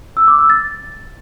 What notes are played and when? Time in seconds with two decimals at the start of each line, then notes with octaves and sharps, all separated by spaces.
0.17 E6
0.28 D6
0.39 E6
0.50 A6